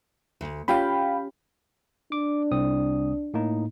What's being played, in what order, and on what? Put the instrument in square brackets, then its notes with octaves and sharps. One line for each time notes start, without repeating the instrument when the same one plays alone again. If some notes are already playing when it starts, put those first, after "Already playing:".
[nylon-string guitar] D2
[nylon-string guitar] C#4 F4 G4 [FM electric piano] F5 G5 B5
[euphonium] D4 [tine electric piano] D6
[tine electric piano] C2 C4 D#6
A2 A#3 D#4